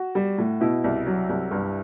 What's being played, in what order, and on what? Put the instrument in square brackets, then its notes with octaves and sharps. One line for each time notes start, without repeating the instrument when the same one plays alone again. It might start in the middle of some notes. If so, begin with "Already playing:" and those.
Already playing: [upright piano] F#4
G3
A2
B2 E4
C2
F#3
C2
G2